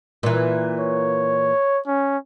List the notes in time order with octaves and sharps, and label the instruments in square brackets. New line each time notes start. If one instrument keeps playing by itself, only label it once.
[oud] A#2 E3
[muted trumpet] C#5
C#4